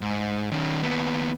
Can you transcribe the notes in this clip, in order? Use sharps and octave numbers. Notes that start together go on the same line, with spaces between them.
G#2
D#3 C#4
D#2 B3